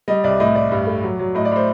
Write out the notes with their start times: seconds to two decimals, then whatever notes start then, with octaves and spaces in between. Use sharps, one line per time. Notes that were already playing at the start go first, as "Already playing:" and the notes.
0.08 G3 D#5
0.24 C2 D5
0.40 A2 D#5
0.55 A2 D5
0.72 G2
0.87 A3
1.03 F#3
1.19 F#3
1.35 A2 D#5
1.45 D5
1.51 A2 C5